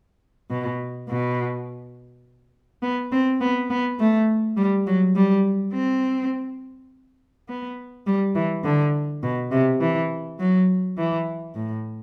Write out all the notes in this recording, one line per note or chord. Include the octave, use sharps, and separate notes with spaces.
B2
B2
B3
C4
B3
B3
A3
G3
F#3
G3
C4
B3
G3
E3
D3
B2
C3
E3
F#3
E3
A2